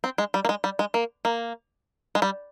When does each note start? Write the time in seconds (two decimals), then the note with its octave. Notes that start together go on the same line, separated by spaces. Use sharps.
0.04 C4
0.18 G#3
0.34 G3
0.45 A#3
0.49 G#3
0.64 G3
0.79 G#3
0.94 A#3
1.25 A#3
2.15 G#3
2.22 G3